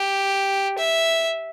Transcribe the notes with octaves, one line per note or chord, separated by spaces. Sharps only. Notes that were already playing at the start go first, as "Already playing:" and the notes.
Already playing: G4
E5